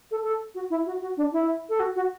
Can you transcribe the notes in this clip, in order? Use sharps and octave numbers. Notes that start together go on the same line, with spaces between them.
A4
A4
F#4
E4
F#4
F#4
D4
E4
A4
F#4
F#4